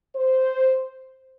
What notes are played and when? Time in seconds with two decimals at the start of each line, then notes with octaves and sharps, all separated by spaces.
0.16 C5